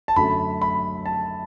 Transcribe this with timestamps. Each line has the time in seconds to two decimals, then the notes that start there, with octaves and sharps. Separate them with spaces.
0.08 A5
0.16 F#2 D3 F#3 A3 B5
0.62 B5
1.06 A5